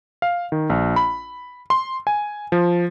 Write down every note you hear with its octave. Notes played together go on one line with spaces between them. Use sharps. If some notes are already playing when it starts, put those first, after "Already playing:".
F5
D#3
A#1
B5
C6
G#5
F3